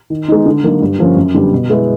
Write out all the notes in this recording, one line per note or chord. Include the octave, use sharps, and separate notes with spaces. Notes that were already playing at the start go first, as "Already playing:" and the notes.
D#3
G#3 B3 D#4
D3
F#3 A#3 D#4
G2
D3 F3 A#3 C#4
F#2
D3 G3 B3
B2
G#3 B3 E4